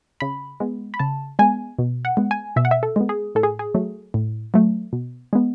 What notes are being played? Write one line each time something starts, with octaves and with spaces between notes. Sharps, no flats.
C#3 B5
G#3 B3
B5
C#3 A5
G#3 B3 G#5
B2
F#5
G#3 B3
G#5
B2 E5
F#5
E5
A4
G#3 B3
G#4
A2 A4
G#4
G#4
F#3 A3
A2
F#3 A3
B2
G#3 B3